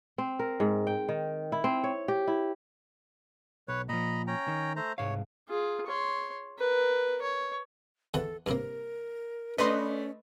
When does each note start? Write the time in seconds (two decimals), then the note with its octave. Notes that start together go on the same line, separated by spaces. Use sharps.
0.18 C4
0.39 A#4
0.60 G#2
0.87 G5
1.09 D#3
1.52 E4
1.64 C4
1.84 C#5
2.08 G4
2.27 E4
3.68 B1 B4 C#5
3.89 A#2 F3 D#5 A#5 B5
4.27 C#4 G5 A#5
4.48 D#3
4.76 A3 C5 A#5
4.98 C2 G#2 C#5 F5
5.49 F4 G#4
5.87 C#5 C6
6.59 A#4 B4
7.22 C#5
8.14 E2 E3 A4 F#5
8.46 G2 C3 A#3 A#4
9.58 A3 C#4 D4 B4 D#5 C6